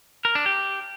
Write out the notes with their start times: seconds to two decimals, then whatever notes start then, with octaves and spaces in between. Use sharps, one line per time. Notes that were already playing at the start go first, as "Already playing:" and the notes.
0.25 A#4
0.35 D4
0.46 G4